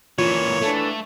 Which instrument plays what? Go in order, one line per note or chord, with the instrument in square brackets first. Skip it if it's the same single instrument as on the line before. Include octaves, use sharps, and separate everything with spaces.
[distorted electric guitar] A#2 E3 [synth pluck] F4 [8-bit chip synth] C#5
[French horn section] E3 D4 A4 [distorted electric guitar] A3